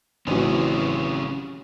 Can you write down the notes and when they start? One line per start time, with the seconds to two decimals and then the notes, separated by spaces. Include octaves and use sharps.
0.27 A1 C#3 E3 F#3 C4 C#4